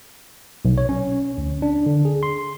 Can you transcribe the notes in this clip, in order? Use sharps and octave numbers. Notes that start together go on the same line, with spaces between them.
B1
C#5
C#4
D2
D4
D3
G#4
C6